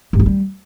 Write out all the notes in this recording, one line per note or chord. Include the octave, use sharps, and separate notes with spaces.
G2
F#3
G3